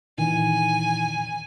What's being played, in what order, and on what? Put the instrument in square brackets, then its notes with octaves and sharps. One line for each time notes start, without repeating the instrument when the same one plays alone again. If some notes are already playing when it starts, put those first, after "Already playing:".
[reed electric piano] A#2 D#3 E3 [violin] G#5